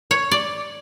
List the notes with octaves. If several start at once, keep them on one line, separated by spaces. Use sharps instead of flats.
C#5
D5